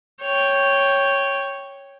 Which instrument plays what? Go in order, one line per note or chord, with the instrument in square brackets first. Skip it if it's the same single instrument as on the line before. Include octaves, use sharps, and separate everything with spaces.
[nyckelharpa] C#5 G5